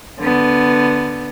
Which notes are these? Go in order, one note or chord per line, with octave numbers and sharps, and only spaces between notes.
D3 B3